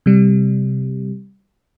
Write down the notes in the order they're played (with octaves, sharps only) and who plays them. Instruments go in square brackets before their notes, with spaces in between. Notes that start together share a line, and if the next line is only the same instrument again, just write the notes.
[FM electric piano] C3 G3